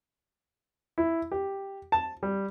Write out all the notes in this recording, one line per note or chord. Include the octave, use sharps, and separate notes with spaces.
E4
G4
A5
G3